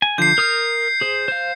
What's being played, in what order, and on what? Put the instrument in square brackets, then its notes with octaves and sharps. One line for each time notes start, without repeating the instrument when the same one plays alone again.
[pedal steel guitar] G#5
[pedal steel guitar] D3 F3 [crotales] G6 C7
[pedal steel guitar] A#4 D#6 F6
G#4 C5
C5 F5